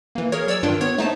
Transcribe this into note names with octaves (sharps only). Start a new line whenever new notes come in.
E3 A#3
G#4 A#4 C#5
F#3 C#5 D5 E6
G2 D#3 D4 F4 G5
B3 C#5
A3 D#4 C5 A5